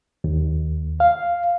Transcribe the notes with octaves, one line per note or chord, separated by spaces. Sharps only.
D#2
F5